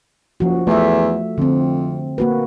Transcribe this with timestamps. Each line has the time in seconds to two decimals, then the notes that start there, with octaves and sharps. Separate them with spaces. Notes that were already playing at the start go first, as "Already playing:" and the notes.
0.40 F#1 F3 F#4
0.67 E2 A3 E5
1.38 F2 D3 C4
2.18 A#3 F#4 B4